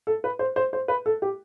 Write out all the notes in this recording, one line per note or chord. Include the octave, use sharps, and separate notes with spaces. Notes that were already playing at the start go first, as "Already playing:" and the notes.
A4
B4
C5
C5
C5
B4
A4
G4